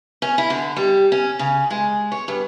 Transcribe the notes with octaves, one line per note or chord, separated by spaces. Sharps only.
C#4
E4
D3
G3
C#4
C#3
G#3
C#5
G2